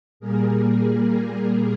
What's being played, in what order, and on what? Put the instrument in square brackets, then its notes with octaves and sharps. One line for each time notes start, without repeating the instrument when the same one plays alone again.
[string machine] A#2 G3 A#3 G#4 A#4